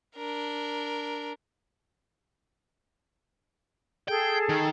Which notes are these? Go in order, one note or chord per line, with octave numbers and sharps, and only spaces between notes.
D4 A#4
G#4 A4 G5
D#3